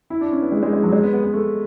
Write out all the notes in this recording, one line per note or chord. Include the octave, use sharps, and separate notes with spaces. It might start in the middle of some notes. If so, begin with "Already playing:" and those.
E4
D4
C#4
B3
G#3
G#3
G#3
F#3
G#3
B3
B3
B3
A3